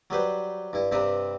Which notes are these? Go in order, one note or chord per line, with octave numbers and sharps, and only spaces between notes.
F#3 G3 B4 C5
G2 E4
G2 C3 C4 B4 A#5